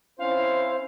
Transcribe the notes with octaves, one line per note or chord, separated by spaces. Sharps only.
C4 C#4 E4 C5 F5